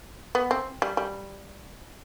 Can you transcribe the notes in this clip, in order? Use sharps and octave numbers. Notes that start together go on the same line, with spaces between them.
B3
C4
G3
G3